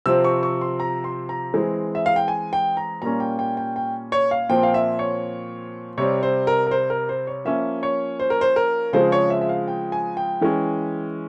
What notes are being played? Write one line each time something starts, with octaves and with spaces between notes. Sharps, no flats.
C3 F3 C4 E6
C#6
C#6
C6
A#5
C6
A#5
E3 G#3 C4
E5
F5
G5
G#5
G5
A#5
A#2 G3 A#3 C#4 A#5
G5
G5
G5
G5
C#5
F5
A#2 F3 C4 G5
F5
E5
C#5
C3 G3 C4 C#5
C5
A#4
A#4
C5
A#4
C5
C#5
F3 A#3 C#4 E5
C#5
C5
A#4
C5
A#4
C#3 F3 G#3 C4 C5
C#5
E5
E5
F5
G5
G#5
G5
E3 G#3 C#4